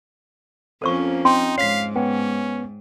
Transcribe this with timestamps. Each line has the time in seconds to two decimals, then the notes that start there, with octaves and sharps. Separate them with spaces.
0.82 F2 A#3 C#4 A4 C5 C#6
1.25 C4 D#4 G5 C6
1.58 G#2 C#5 F5 B6 C7
1.96 B3 C#4 G5